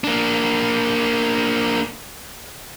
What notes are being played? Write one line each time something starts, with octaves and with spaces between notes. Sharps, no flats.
A#3 D4